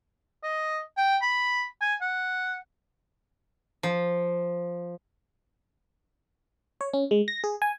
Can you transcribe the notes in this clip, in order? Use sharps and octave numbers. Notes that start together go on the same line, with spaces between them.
D#5
G5
B5
G#5
F#5
F3
C#5
C#4
G#3
A#6
G#4
G#5